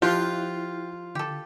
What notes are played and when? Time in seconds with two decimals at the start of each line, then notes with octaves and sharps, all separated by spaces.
0.02 F3 E4 F4 G4 F#6
1.15 D3 G4 A4